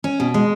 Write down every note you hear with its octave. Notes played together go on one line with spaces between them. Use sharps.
C#4
B2
G#3